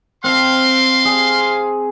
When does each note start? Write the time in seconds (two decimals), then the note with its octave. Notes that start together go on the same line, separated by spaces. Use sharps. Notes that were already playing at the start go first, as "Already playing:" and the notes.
0.24 C4 C5 F5 A5 C6
1.05 G#4